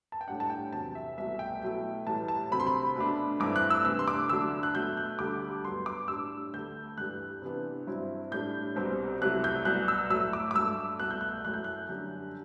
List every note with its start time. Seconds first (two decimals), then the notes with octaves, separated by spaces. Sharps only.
0.12 A5
0.21 G5
0.27 A2 G3 D4 F#5
0.40 A5
0.50 G5
0.73 E2 C3 F#3 A5
0.95 E5
1.17 C2 B2 A3 E5
1.39 G5
1.62 B2 F#3 A3 E4
2.07 A2 E3 G3 A5
2.28 A5
2.51 D2 C3 F#3 C4 B5
2.60 C6
2.67 B5
2.96 B2 A3 D4
3.40 G2 E3 A3 C4 E4 D6
3.56 F#6
3.70 E6
3.85 C3 E3 A3 D4 E6
3.99 C6
4.08 D6
4.29 D2 D3 F#3 A3 D4 E6
4.63 F#6
4.74 B2 F#3 A3 G6
4.97 F#6
5.19 D2 D3 G3 D6
5.64 G2 F#3 B3 C6
5.86 D6
6.08 A2 G3 D4 E6
6.53 D2 D3 A3 G6
6.98 G2 E3 G3 F#6
7.42 C3 E3 B3 D4
7.87 G2 F#3 C4 E4
8.31 A2 G3 D4 G6
8.76 C2 B2 G3 C4
9.21 C2 C3 F#3 A3 E4 F#6
9.44 G6
9.65 C2 B2 F#3 F#6
9.88 E6
10.10 A2 F#3 A3 E6
10.33 D6
10.51 D6
10.55 G2 F#3 A3 E6
11.00 C2 B2 A3 F#6
11.11 G6
11.21 F#6
11.45 F#2 F#3 A3 E4 F#6
11.54 G6
11.64 F#6
11.89 F#2 D3 G3 D4